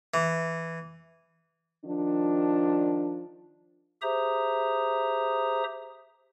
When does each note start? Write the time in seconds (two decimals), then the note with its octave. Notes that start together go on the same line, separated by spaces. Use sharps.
0.14 E3
1.85 D#3 F3 D4
4.02 G4 G#4 C5 E5 A#5 D#6